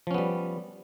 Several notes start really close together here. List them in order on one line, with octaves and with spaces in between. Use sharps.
F3 C#4 B3 G3